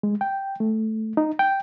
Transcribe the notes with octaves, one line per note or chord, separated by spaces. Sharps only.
G#3
G5
A3
D#4
G5